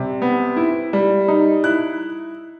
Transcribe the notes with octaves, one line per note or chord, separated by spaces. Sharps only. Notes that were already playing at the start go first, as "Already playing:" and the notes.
Already playing: C3 G3
B3
E4
G3
D#4
E4 F#6